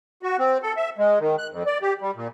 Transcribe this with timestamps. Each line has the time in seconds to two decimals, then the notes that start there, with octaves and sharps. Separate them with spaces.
0.23 F#4
0.39 C4
0.63 A4
0.77 E5
0.98 G#3
1.20 D#3
1.38 F#6
1.51 F2
1.66 D5
1.82 G4
2.01 G3
2.16 A#2